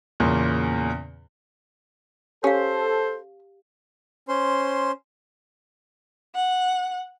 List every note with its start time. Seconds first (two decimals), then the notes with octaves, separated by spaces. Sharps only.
0.20 E2 A#2 C#3
2.44 C#4 G4 A4 C5 F5
4.28 C#4 C5 C6
6.34 F#5